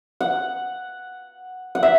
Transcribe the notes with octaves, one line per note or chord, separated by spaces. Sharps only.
F#5
F#5
E5